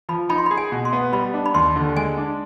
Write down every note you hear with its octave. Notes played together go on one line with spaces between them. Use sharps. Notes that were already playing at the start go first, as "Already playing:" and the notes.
F3 B5
D#4 B5
C6
B5
G#4
G#5
B2
C6
B3
G3 B5
D4
B5
D#2 C6
D3
G#3 G#5
D4